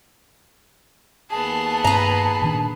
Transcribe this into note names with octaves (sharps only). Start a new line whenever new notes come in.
D#2 B3 G#4 A5
G2 B4 A5 A#5
A#2 D#3 D4